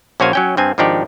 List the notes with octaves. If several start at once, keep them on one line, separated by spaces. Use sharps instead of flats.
A#1 C#4 F#4 C5 F5 G#5
F#3 C#4 G5
G2 C4 G#5
G#1 F3 D4 D#4 G4 D5